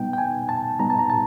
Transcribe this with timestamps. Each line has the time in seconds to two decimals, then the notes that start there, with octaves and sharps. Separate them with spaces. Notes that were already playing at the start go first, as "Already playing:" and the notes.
Already playing: B2 G3 B3 D#4 G5
0.13 G5
0.18 G#5
0.49 A5
0.79 B2 G3 B3 D#4 A#5
0.90 A5
0.99 A#5
1.10 A5